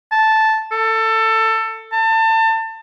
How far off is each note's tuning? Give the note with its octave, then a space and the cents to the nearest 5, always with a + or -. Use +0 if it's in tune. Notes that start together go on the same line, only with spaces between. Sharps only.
A5 -5
A4 +20
A5 +30